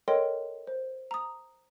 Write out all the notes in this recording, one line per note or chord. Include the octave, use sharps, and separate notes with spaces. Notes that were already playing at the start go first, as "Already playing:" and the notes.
A4 A#4 C#5 D#5 G5 C6
C5
A#5 D#6